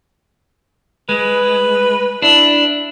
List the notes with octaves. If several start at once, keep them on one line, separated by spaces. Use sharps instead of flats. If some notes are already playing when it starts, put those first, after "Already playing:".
G#3 B4
D4 E4